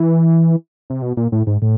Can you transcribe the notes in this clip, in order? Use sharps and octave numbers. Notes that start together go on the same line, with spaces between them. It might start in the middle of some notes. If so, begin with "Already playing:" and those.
Already playing: E3
C3
B2
A#2
A2
G#2
A2